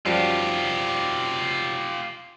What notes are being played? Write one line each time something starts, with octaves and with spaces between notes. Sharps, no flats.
F#2 F3 G3 F4 G4